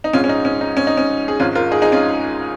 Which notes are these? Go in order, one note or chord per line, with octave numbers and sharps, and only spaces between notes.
D#4
A#1 G#2 G#3 C#4 F4
C#4
D#4
C#4
D#4
C#4
D#4
C#4
G#4
G#1 G#2 G#3 C#4 F4
F4 A#4
D#4 G#4
D#4 G#4
C#4 F4